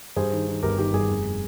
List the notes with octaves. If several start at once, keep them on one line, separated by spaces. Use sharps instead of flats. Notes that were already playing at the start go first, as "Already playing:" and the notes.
G2 G#4 C5
D#3
D#3
G1 G4 A#4
D#3 G4 A#4
G2 G#4
F1